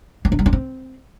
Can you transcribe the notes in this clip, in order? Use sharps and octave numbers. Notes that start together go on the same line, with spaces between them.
A#3
D4
G3
D4
C4